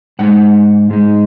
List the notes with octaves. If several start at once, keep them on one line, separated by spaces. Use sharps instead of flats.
G#2 G#3 D#4 F#5
G#2 G#3 D#4